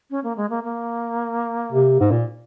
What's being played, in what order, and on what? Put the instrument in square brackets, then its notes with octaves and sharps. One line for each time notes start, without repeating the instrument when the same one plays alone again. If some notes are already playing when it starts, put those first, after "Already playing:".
[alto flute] C#4
A#3
G#3
A#3
A#3
[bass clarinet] C3
G#2
A#2